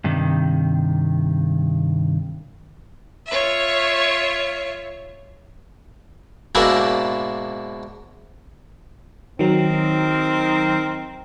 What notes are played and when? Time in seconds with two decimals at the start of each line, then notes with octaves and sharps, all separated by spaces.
0.04 G2 C3 D#3
3.27 F4 C#5 E5
6.55 G#2 B2 A#3 D4 E4 E5
9.39 D#3 F#3 C4 D#4 A#4